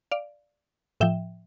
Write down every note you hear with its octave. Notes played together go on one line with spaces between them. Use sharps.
D5 F5
A2 F3 E5 G5